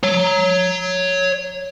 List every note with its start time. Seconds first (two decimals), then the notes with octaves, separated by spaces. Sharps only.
0.03 C#5 A#5